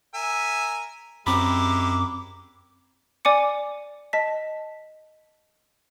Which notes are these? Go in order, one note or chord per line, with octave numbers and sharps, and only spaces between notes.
A#4 E5 G#5
F#2 G#3 C4 E4 G4 A#5 B5 D6
D5 G#5 D6 C#7
D#5 A5 B6